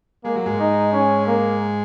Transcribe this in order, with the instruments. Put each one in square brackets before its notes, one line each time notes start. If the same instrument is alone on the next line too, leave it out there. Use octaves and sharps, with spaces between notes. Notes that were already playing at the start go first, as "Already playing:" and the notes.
[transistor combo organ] G#3 [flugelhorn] A#3
[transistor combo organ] F#3
G#2 G#3
[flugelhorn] D#4
C#4
A#3